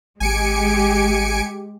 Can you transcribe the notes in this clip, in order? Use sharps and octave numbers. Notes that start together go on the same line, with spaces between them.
G#1 G#3 G4 G#5 C#7 D7